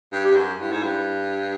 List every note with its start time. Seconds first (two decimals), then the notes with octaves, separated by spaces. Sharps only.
0.12 G2
0.24 G4
0.31 G2
0.36 F#2
0.60 G2 E4
0.72 G#2
0.83 G2